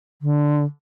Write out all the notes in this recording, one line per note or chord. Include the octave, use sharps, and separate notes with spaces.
D3